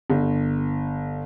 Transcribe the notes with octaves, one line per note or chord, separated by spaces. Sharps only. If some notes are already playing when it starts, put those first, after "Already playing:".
G1